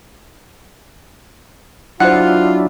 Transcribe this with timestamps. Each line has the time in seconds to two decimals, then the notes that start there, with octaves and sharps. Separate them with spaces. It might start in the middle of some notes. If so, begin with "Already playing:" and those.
2.00 F#3 D4 E4 F4 C5 F#5 F#6